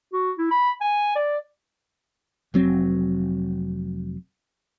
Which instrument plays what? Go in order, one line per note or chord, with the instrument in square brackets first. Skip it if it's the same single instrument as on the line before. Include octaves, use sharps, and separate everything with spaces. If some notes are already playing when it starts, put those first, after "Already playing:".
[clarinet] F#4
E4
B5
G#5
D5
[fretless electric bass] F1 F#3 C4